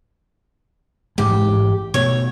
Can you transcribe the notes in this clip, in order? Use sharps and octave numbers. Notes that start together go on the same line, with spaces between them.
A1 G#2 G#3 G4
B2 A3 C#5